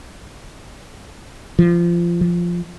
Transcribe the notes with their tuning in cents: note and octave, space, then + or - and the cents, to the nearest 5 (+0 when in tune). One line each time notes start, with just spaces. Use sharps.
F3 -20
F3 -5